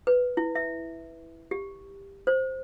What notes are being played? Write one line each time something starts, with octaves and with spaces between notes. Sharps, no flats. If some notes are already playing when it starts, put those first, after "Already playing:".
B4
E4
E5
G4
C5